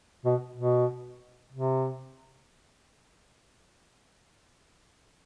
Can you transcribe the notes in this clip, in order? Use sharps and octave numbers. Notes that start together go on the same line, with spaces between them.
B2
B2
C3